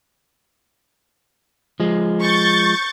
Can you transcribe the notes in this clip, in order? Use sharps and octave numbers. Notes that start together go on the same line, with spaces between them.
F3 G#3
C#6 G6 A6